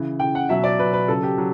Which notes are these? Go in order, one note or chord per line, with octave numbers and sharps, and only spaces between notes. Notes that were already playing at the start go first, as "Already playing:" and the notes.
Already playing: C#3 E3
C#3 E3 G5
F#5
B2 F#3 E5
D5
B2 F#3 B4
B4
C#3 F#3 A4
G4
F#3